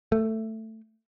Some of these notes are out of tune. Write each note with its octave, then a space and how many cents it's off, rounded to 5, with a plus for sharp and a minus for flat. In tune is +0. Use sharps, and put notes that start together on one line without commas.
A3 +10